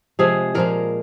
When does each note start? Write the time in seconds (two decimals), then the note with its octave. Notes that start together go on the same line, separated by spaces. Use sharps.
0.19 C3 F3 G#3 G#4
0.55 A#2 F3 G#3 A#4